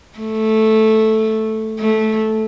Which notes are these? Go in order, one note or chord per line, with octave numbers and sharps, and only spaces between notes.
A3
A3